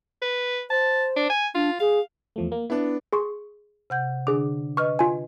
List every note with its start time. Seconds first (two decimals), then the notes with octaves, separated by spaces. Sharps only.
0.22 B4
0.70 C5 A5
1.16 D4
1.30 G#5
1.55 D4 F4
1.80 G#4 F5
2.36 E2 F3 A3
2.52 A#3
2.70 B3 D4 E4
3.13 G#4 C6 C#6
3.90 C3 F#5 G6
4.27 D3 D4 G#4 D6
4.77 B4 D#5 C#6 F6
4.99 F4 G#5